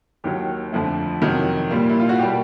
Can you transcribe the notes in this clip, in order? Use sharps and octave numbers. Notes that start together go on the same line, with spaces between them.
D#2 D#3 F#3 G4
F2 D3 F3 A3
F2 C3 D#3 F#3
A#2 G3 A#3
E4
F4
F#4
B2 G3 A#3 G4